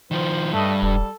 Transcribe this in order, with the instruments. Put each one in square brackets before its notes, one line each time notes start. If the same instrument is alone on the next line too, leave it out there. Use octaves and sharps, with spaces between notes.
[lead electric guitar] D#3 F3 [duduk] C5
[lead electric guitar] G2 [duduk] G3 [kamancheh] A3 D#5
[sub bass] E1 [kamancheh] A4